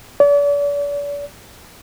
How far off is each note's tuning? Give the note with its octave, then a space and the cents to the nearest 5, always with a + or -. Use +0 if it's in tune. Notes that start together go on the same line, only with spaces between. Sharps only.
D5 -40